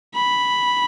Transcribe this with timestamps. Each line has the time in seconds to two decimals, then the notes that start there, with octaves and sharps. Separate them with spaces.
0.15 B5